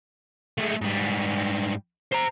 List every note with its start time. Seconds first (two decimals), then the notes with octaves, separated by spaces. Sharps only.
0.58 G#3 A3
0.82 G#2 G3
2.12 C5 A#5